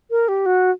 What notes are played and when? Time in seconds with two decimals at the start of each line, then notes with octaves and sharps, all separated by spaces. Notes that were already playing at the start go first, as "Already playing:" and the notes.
0.11 A#4
0.28 G4
0.46 F#4